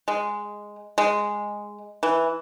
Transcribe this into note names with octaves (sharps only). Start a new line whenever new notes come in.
G#3
G#3
E3